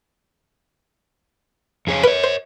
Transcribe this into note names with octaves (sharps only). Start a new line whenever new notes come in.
F2 G#4 C#5
A#4 B4 C#5
C5